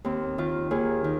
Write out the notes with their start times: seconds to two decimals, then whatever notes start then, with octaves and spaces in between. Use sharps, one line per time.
0.05 D#2 C4
0.38 D#3 F4
0.71 D#2 G#4
1.04 D#3